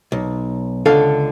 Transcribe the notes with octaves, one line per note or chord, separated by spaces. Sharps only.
B1
C#2 D3 A4 F5